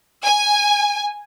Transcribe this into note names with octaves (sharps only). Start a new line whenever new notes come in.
G#5